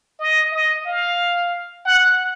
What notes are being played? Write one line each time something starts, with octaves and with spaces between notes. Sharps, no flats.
D#5
D#5
F5
F#5